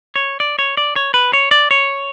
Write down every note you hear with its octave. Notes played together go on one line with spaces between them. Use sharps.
C#5
D5
C#5
D5
C#5
B4
C#5
D5
C#5